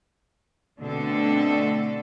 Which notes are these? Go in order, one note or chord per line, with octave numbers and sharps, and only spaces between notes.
B2 D3 A3 C4 D4 A4